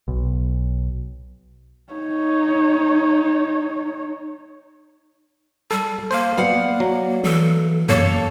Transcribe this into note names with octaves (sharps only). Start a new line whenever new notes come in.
B1
D#4 C#5
G3 A4
A#3 C5 F5
B3 D5 F5 F#5
F#3
E3 A4
F#2 A#3 A4 C#5 A5